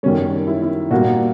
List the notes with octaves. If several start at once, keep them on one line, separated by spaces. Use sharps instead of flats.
F#2 D#3 G3 C#4
E4
E4
A#2 G3 A#3 F#4